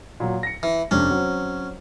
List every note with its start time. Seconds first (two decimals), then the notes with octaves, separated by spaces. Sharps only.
0.20 A#2 F#3
0.43 A#6 C#7
0.63 E3
0.91 F2 C3 C#4 D4
1.10 F#3 C4